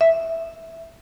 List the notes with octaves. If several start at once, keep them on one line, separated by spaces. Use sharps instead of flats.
E5